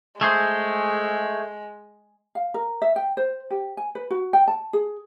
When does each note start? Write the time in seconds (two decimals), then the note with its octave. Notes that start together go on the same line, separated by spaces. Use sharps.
0.21 G#3 A3 G#4 C5
2.35 F5
2.54 A#4
2.82 E5
2.96 G5
3.17 C5
3.51 G4
3.77 G#5
3.95 B4
4.10 F#4
4.33 G5
4.48 A5
4.73 G#4